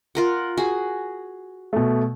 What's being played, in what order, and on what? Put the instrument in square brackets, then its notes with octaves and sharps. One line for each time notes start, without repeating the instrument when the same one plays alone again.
[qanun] F4 A#4 F#5
F#4 G#4
[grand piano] B2 A3